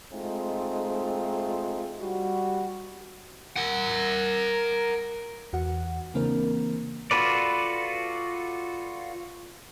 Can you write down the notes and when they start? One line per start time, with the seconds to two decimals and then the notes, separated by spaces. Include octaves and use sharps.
0.12 G#3 A3 C4 D#4 F4
1.99 G3 F#4
3.56 A#4 F#5
5.53 E2 F#4 F#5
6.14 C#3 E3 A#3 C4 D4 A#4
7.11 F4 F#4 A4 B4 D5